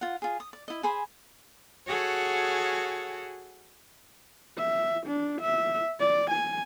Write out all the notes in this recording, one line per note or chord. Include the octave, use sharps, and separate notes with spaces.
F4 F#5
F4 G#4
D#6
D5
E4 D#5
G#4 C5 G#5 B5
F#4 G#4 A4 C#5 F#5
E5
D4
E5
D5
G#5